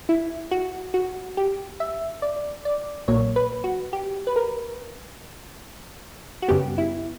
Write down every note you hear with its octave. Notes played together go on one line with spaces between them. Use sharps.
E4
F#4
F#4
G4
E5
D5
D5
B1 A#2 F#3 A#3 C#5
B4
F#4
G4
B4
A#4
F#4
F#2 C#3 G3 B3 G4
E4